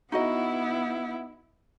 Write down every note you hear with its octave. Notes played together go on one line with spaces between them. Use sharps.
B3 D#4 E4 F#4 D#5